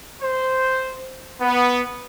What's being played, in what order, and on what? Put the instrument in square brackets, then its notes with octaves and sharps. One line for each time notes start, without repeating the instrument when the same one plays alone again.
[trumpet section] C5
B3